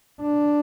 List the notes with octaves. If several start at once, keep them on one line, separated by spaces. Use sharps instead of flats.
D4